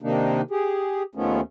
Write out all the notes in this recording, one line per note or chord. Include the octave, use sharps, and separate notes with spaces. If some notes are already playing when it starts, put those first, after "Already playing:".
C3 D#3 A#3 D4 D#4
G4 G#4
D#2 D#3 F3 A3 B3 C#4